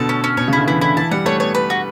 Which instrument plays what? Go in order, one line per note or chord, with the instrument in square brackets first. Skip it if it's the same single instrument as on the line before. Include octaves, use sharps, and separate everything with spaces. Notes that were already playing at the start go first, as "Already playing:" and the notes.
Already playing: [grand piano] B2 D3 [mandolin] A4
[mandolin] C#4
C#4
[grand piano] B2 [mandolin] C#5
[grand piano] C#3
[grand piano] D3 [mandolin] E4
[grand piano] E3 [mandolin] E4
[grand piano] D3 [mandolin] E4
[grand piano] E3 [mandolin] A5
[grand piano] G3 [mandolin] F#5
[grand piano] A3 [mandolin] C#5
[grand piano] B3 [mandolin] C#5
[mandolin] B4
F#4